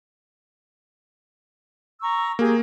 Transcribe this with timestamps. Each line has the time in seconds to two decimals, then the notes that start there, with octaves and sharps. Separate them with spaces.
2.01 A#5 C#6 E6
2.39 A#3 G4 G#4